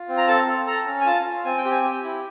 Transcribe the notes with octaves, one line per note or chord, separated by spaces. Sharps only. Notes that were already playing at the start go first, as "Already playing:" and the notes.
Already playing: F4
C4
A#5
A4 A5
A4
A4 A#5
C#4
G#5
F4 A5
F4
C4 G#5
G5
G4
G#5
G4
E4